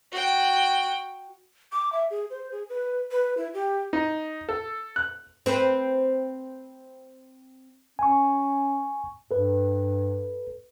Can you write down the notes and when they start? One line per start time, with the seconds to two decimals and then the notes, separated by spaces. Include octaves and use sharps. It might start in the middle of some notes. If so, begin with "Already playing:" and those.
0.12 F#4 G5
1.72 D6
1.92 E5
2.10 G#4
2.30 C5
2.52 G#4
2.69 B4
3.11 B4
3.37 E4
3.54 G4
3.93 D#4
4.49 A4
4.96 F#6
5.46 C4 B4
7.99 C#4 G#5 C#6
9.31 G2 A4 B4